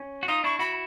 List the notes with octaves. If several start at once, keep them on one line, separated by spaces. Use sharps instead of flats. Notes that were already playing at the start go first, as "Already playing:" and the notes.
Already playing: C#4
F#4
D#4 F4 D#6
D4 E4 C#6
E4 F#4 B5